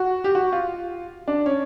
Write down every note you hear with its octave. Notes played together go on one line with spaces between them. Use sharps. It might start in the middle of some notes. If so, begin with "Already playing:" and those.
Already playing: F#4
G4
F#4
F4
D4
C#4